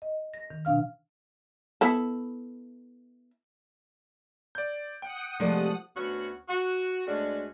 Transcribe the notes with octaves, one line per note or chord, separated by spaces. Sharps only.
D#5
A#6
D#3
B2 D4 F5 F6
B3 E4 A4
D5 G6
F#5 G5 D#6
C3 F3 G#3 A3 G4 D5
D2 B3 C#4 F#4
F#4
D2 G#3 C#4 D4 F#4